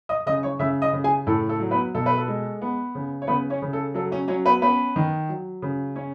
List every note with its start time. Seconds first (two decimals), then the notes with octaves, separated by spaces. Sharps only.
0.09 D#5 D#6
0.26 C#3 D#5 D#6
0.43 C#5 C#6
0.59 C#3 E5 E6
0.82 D#5 D#6
0.93 C#3
1.04 G#4 G#5
1.27 A2 A4
1.49 A4
1.60 F#3
1.71 B3 B4
1.95 B2 A4
2.06 B4
2.18 A4
2.28 G#3
2.62 B3
2.95 C#3
3.22 C#5
3.27 C#3 B3 B4
3.50 C#4 C#5
3.62 C#3
3.73 A4
3.94 F#3 A4
4.11 C#4 C#5
4.28 F#3 C#4 C#5
4.45 B3 B4
4.62 B3 C#4 B4
4.96 D#3
5.29 F#3
5.62 C#3
5.96 C#4 C#5